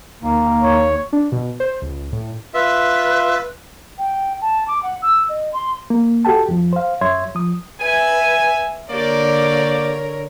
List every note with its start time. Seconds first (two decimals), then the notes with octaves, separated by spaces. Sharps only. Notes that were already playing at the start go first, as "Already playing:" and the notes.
0.23 D#2 A#3
0.62 D#2 C#5
1.13 D4
1.32 B2
1.60 C5
1.82 C#2
2.12 A2
2.54 F4 B4 E5
3.98 G5
4.41 A5
4.67 D6
4.82 F#5
5.02 E6
5.28 D#5
5.53 C6
5.90 A#3
6.25 F#4 G4 A4 G5 A5
6.49 F2 F3
6.73 C5 F5
7.01 F#2 C#5 E5 C6 G#6
7.35 F3 D#6
7.80 B4 E5 G#5
8.90 D3 A#3 G4 A#4 C#5 D5